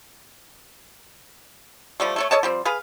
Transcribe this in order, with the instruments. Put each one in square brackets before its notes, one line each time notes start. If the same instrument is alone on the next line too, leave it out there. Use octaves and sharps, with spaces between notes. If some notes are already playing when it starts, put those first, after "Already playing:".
[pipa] F3 G3 A3
A3 A4 C#5
A4 C#5 D#5 A5
F3 G3 C4
G#4 B4 F5